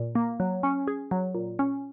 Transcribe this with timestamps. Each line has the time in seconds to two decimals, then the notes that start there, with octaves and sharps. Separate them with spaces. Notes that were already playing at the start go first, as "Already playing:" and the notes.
Already playing: A#2
0.15 A#3
0.40 F#3
0.63 C#4
0.87 G#4
1.11 F#3
1.35 A#2
1.59 C#4